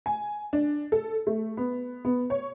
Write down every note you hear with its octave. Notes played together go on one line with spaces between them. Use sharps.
G#5
D4
A4
A3
B3
B3
C#5